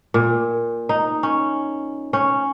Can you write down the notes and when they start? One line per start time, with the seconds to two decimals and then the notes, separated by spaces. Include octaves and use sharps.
0.14 A#2
0.89 D#4
1.23 C#4
2.13 C#4